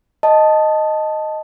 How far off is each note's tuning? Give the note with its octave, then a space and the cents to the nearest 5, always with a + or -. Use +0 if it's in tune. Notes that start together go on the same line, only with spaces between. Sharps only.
D#5 +0 A5 +0